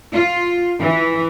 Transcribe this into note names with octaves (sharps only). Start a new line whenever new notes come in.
F4
E3